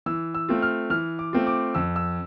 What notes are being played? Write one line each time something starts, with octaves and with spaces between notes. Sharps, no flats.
E3 E6
E6
A3 C4 F4
F6
E3 F6
D6
A3 C4 F4
D6
F2 E6
E6